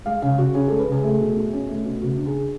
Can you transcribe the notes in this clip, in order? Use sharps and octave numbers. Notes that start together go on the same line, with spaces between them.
G#3 F5
C#3 F5
C#3 F#4
C#4 G#4
A4
G#3
B4
C#3 G#4
A3
B2
B2
C#4
A3
B2
C#3 F#4
D4
G#4